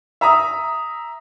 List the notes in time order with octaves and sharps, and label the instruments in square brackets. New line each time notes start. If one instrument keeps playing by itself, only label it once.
[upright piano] E5 A#5 D#6